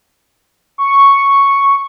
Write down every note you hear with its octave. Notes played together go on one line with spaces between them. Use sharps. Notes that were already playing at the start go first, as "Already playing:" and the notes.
C#6